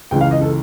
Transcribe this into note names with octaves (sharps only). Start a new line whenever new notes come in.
C#2 C#3 E3 G5
F5
D#5
A4